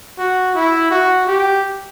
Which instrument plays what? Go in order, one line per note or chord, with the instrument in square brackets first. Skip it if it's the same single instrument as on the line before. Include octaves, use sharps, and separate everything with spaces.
[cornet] F#4
E4
F#4
G4